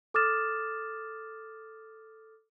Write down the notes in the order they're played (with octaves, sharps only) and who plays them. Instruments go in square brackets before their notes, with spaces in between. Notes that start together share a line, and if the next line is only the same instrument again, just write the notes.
[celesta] A4 D6 D#6 F6 A6 E7